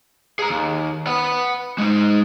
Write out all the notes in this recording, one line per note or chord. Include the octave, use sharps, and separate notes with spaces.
G#4 A#5
D#2
F#5 B5
G#3 D#4